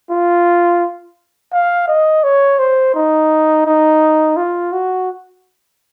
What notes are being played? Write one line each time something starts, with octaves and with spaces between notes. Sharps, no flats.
F4
F5
D#5
C#5
C5
D#4
D#4
F4
F#4